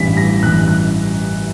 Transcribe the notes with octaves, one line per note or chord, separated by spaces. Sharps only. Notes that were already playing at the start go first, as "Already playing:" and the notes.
Already playing: A1 G2 E3 B6
A#6
A1 G2 E3 F#6
F#6